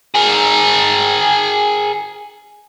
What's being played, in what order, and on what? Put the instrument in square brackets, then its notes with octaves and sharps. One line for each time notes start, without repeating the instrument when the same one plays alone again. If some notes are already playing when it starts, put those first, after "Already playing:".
[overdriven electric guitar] G#4 A#4